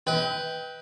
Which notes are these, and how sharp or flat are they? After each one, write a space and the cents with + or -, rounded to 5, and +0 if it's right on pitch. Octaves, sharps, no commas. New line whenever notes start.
B4 +0 D#5 +45 G5 +0